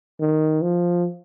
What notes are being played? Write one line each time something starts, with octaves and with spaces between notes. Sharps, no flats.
D#3
F3